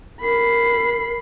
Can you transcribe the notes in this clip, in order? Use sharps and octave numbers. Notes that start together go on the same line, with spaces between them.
A#4 B5 C7